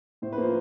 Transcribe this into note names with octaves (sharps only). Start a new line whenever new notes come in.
A2 C5
B4
F3 A#3 C5